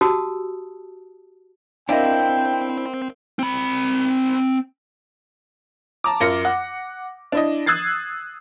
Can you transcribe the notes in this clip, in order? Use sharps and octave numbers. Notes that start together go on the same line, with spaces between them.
F#4 G4 A5 D#6 E6
C4 D4 E4 A#4 D#5 F5 G5
C4 B5
A5 A#5 D6
F#2 F4 A#4 A#6 C#7
F#5
D4 E4 D#5
D#6 E6 F#6 G#6 A6 C7